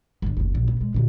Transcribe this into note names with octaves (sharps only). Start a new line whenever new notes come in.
G1 D3
F#1 D#2
A#1
B2
G#3
A#2 D3